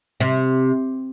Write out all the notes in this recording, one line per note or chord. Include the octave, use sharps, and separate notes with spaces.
C3